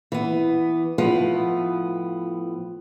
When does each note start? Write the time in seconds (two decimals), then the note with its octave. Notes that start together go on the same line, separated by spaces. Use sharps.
0.12 E3 B3
0.98 A2 F3 B3